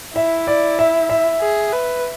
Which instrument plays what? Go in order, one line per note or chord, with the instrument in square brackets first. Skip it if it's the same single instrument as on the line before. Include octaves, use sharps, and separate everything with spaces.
[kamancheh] E4 [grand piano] E5
[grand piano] D5
E5
E5
[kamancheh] G#4
B4